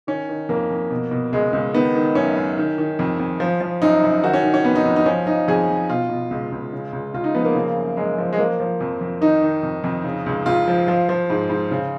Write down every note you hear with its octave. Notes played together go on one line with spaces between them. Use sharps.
D#3 C#4
D#3
F2 A#3
F2
B2
B2
C#2 G#3
C#2
D#3 B3
D#3
F#2 C#4
F#2
D#3
D#3
F2
F2
F3
F3
F#2 D#4
F#2
D#3 F#4
C#4
D#3
C#4
F2 B3
D#4
F2
D#4
F3 C#4
F3 D#4
F2 G#4
F2
B2 F4
B2
C#2
C#2
C#3
C#2
C#2 F4
D#4
F3 B3
A#3
C#3
F#2
F#2 G#3
F3
G#3
F3 A#3
F3
F2
F2
D#3 D#4
D#3
F2
F2
C#3
C#2
C#2 F4
F3
F3
F3
G#2
G#2
C#3